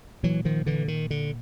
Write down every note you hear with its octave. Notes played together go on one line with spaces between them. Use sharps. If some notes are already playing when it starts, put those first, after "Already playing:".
A#2 E3 F#3
D#3 F3
D3 E3
D#3
D3